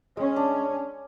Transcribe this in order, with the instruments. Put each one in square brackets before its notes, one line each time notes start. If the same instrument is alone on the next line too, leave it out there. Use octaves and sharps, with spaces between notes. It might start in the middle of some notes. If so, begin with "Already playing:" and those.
[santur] G#3 [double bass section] C#4
[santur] D4